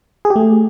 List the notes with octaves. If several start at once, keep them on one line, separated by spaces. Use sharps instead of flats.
G#4
G4
A3